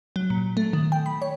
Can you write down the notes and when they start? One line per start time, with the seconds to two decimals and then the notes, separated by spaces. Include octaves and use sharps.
0.16 F#3
0.30 A#2
0.57 A3
0.73 D#3
0.92 G5
1.06 B5
1.22 C#5